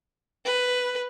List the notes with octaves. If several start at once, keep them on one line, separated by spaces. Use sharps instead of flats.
B4